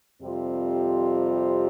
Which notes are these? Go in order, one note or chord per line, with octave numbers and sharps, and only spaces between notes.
F2 C3 G3 C4 F4